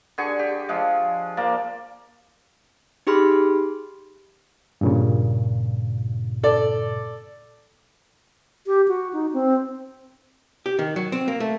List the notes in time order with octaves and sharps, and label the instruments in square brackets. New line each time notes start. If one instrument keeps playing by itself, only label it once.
[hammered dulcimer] D3 G#4 G#5 C#6
G4
F3 G#3
F3 A#3 D5
[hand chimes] D#4 G4 G#4 B5 C6 F6
[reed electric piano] G2 A#2 C#3
[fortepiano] A4 D5
[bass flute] G4
F#4
D#4
C4
[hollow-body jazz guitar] G4
D#3
F#3
C4
A#3
A3